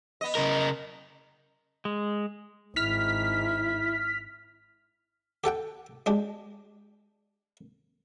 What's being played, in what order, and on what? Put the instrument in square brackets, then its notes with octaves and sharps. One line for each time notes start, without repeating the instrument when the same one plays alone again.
[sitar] B3 D#5
[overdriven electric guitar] C#3 A#4
[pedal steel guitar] G#3
[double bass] G#1 [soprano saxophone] E4 [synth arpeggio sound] F6 B6
[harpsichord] G4 A4 F#5 G5
G#3 D4 G4